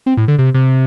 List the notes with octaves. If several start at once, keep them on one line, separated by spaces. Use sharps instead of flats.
C4
A2
D3
C3
C3